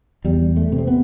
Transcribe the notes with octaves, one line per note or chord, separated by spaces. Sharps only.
E2 G3
A3
C3
C4
B3